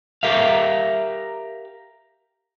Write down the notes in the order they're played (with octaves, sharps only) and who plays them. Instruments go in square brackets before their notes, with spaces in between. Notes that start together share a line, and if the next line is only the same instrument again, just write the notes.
[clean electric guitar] G4 A#4 E5 F5